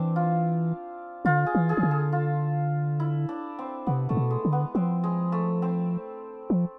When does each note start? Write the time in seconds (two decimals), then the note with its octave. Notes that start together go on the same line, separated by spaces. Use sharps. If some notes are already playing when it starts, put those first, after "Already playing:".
Already playing: E3 C4 D4
0.16 F4
1.25 D3 F4
1.46 G#4
1.55 E3
1.69 G#4
1.77 E3
1.83 D3
1.91 A4
2.12 F4
3.00 E4
3.29 D4
3.59 C4
3.87 C3 B3
4.09 A2 A3
4.17 B2
4.31 G#3
4.45 D3
4.52 B3
4.75 F3 C4
5.04 G#3
5.32 A3
5.62 C4
6.50 F3